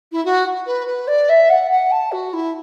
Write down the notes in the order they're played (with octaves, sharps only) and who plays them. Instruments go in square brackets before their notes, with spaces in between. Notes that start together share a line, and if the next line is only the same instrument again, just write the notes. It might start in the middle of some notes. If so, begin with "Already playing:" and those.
[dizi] E4
F#4
B4
B4
D5
E5
F#5
F#5
A5
F#4
E4